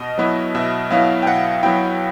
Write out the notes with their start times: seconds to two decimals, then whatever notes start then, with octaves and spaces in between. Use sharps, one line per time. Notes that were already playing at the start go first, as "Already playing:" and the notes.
Already playing: B2 D#5
0.18 F#3 B3 E4
0.55 B2 E5
0.90 F#3 B3 E4 F5
1.22 G5
1.26 B2 F#5
1.63 F#3 B3 E4 G5